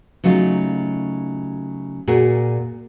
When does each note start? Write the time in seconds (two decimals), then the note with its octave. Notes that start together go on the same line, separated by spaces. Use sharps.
0.24 C#3 F#3 A3 D#4 F4
2.07 A#2 F#4 G#4 A#4